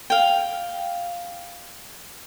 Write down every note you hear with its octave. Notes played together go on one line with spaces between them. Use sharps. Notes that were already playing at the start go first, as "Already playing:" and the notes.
F5 G5